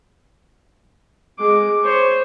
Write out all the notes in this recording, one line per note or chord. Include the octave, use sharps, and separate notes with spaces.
G#3 D6
C5 C#5